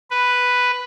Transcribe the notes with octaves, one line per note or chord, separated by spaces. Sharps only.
B4